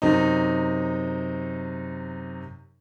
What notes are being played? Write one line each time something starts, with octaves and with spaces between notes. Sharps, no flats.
F#2 C3 D#4